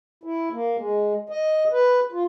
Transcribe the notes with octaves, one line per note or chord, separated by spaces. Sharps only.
E4
A#3
G#3
D#5
B4
F4